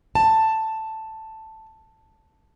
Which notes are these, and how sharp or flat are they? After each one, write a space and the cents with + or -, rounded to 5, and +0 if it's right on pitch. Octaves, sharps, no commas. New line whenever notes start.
A5 +5